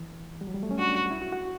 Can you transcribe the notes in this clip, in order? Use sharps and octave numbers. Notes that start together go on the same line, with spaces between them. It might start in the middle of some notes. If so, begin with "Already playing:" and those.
Already playing: E3
G3
F#3
G3
A3
C#4
D4 F#4
F#4
E4
F#4
F#4